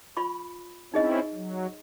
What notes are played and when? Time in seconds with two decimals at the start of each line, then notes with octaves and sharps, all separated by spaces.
0.17 F4 B5 C#6
0.94 C4 C#4 D#4 E4 G#4 D#5
1.34 F#3